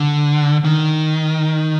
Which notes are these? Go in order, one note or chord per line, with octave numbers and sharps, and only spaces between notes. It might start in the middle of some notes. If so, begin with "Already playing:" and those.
Already playing: D3
D#3